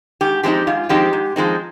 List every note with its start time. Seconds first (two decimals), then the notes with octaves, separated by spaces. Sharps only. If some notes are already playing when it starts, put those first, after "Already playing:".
0.21 G#2 G4
0.43 F3 G#3 C4 D#4 G4
0.67 G#2 F4
0.89 F3 G#3 C4 D#4 G4
1.13 G#2
1.36 F3 G#3 C4 D#4